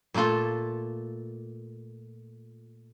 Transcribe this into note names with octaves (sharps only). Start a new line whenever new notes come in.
A#2 A3 A#3 F4 A4